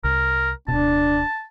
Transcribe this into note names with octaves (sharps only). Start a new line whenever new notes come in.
C2 A#4
D1 B2 D4 A5